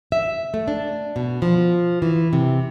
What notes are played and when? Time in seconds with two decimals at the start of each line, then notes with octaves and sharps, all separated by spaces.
0.12 E5
0.54 A3
0.68 D4
1.16 B2
1.42 F3
2.02 E3
2.33 C3